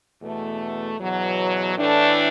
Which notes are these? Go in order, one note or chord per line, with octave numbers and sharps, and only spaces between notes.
E2 B2 A3
E2 B2 F#3
A2 E3 A3 D4